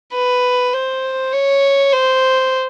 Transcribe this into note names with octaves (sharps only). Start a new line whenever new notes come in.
B4
C5
C#5
C5